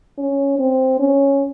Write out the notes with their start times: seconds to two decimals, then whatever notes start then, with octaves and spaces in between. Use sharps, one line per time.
0.18 C#4
0.59 C4
1.00 C#4